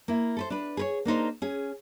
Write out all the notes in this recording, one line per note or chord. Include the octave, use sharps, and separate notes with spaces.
A#3 E4
A4 B4 C5
D4 B4
G#4 B4 C#5
A#3 D4 D#4 C5
C#4 G#4